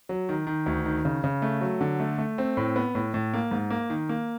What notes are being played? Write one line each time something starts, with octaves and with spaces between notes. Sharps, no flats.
F#3
D#3
D#3
D2
D#3
C#3
C#3
A3
F#3
D3
A3
A3
C4
A2
B3
A2
A2
A#3
G#2
A#3
D#3
A#3